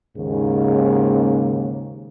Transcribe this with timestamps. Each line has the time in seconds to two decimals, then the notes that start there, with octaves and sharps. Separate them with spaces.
0.16 D#2 G#2 C#3